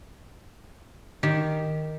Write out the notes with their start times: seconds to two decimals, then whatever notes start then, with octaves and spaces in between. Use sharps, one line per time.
1.23 D#3 G4